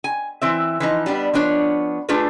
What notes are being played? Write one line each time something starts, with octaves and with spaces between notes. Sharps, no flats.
G#5
E3 C4 E5
E3 F3 D#4
G3 B3 D4
F3 B3 D4 C#5
A3 D4 F4 G#4 A4 B4